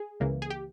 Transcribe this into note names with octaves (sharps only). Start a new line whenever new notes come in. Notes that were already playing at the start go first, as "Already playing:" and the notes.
Already playing: G#4
C#2 C#3 E3 A#3
G#4
G4